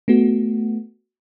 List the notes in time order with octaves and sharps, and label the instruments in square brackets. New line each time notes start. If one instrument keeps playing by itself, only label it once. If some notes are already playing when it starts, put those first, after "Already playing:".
[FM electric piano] A3 B3 F#4